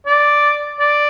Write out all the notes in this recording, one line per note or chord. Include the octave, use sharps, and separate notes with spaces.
D5
D5